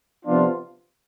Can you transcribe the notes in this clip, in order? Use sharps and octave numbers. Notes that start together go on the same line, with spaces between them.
C3 F3 B3 D4 F4